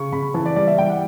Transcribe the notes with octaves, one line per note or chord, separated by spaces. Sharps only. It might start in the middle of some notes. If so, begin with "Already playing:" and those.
Already playing: C#3 C#6
C#3 B5
E3 A5
D5
G3 D5
E5
G3 G5
F#5